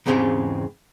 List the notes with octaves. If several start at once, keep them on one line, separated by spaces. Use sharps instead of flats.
E2 G#2 C#3 C4 G4 G#4